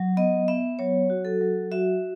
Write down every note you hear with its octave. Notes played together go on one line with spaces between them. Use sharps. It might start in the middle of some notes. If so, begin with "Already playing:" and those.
Already playing: F#3
B3 D#5
B3 E5
F#3 C#5
F#4
A4
F#3
F#4 E5